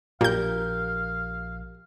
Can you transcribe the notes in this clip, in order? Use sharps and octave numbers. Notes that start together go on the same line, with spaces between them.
A#1 A#2 G4 A#4 F5 G6